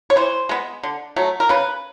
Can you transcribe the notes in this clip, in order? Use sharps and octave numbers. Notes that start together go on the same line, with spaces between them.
C#5
E3 C5
G#3 B3
D3
F#3 A3
A#4
C#3 B4